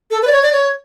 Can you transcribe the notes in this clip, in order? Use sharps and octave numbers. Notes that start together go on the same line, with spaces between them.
A4
B4
D5
C#5
D5
C#5